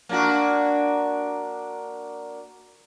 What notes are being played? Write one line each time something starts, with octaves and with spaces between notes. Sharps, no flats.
A#3 D4 F#4